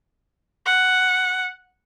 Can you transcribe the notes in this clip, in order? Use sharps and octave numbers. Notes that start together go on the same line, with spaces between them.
F#5